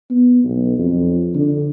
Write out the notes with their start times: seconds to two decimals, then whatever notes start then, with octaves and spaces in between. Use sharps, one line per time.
0.10 B3
0.44 B1
0.78 F2
1.35 D3